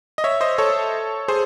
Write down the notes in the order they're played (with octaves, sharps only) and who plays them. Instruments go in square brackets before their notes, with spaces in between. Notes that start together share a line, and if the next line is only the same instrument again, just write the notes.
[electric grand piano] D#5
C#5 E5
C5 D#5
A4 C#5
G#4 C5